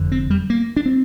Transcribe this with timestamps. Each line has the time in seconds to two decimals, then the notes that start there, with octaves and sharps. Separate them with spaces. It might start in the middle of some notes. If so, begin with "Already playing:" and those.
Already playing: F1 F2 D3
0.12 C4
0.30 G3
0.50 A#3
0.77 D4
0.86 C4